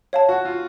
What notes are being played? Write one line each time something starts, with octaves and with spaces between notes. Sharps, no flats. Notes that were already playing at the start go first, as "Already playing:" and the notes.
C#5 F5 A5
F#4
F4